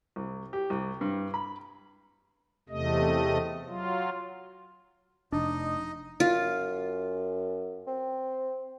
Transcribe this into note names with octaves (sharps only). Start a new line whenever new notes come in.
C2
G4
C2
G2
B5
E2 C3 A3 D#5
F#3 F4
F1 D4 D#4 D#5
F#2 F4
C4